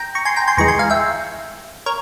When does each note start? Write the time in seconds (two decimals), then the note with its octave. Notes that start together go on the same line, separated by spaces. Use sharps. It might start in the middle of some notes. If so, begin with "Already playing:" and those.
Already playing: G5 A#5
0.15 A#5 C#6
0.25 G#5 C6
0.36 G5 A#5
0.47 G#5 C6
0.57 E2 E3 G#3 A#5 C#6
0.68 G#5 C6
0.79 F5 G#5
0.90 E5 G5
1.86 A#4 C#5